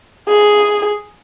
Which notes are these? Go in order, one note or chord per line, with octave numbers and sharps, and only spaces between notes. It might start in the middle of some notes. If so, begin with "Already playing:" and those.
G#4